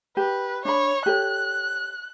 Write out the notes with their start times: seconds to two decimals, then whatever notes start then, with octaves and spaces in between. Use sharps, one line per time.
0.17 G4 B4
0.65 D4 C#5 B5
1.06 G4 A4 C#5 F#6